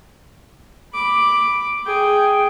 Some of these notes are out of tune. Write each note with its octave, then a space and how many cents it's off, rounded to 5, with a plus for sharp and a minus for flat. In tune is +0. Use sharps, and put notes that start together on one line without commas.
B5 +0 D6 +0
G#4 +0 G5 +0